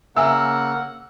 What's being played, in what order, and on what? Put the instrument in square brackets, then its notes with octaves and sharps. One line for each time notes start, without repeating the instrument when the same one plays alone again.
[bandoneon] C#3 A#3 A#4 [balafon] E5 G#5 [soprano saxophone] F#5 [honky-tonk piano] E6